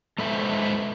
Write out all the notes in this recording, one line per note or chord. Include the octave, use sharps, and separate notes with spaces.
G#3 A4 B4 C5 E5